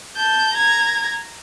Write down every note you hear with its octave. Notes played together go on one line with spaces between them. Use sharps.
A5 G6
A#5 G#6